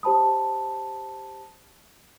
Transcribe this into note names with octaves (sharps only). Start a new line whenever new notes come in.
G4 C5 A5 B5 D#6